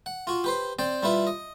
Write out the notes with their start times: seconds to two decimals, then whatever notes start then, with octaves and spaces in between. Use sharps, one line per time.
0.06 F#5
0.27 F4 F#4
0.44 G4 B4 C5
0.79 C4 D5 G5
1.03 G3 E4 F4 B4
1.27 D#5